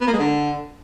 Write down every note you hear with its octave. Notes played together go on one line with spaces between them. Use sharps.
B3
A#3
G#3
D3